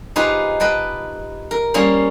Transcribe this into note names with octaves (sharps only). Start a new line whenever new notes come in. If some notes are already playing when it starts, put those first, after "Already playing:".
D#4 F4 G4 G#4 B4 C5
B4 D#5 G5 A5
A#4
G3 A#3 C#4 G#4 C5